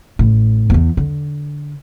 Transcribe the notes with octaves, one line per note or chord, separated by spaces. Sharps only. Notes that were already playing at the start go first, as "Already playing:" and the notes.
A1 A2
E2 E3
D3